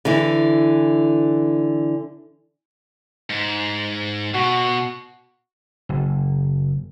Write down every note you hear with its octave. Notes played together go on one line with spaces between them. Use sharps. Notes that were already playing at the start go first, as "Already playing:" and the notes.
D3 E3
G#2
B2 F#4
F#1